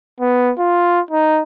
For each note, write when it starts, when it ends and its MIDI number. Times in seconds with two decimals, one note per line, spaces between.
0.20 0.51 59
0.58 1.00 65
1.11 1.42 63